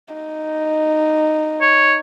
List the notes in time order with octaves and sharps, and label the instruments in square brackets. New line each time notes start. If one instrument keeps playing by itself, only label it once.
[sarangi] D#4
[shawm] C#5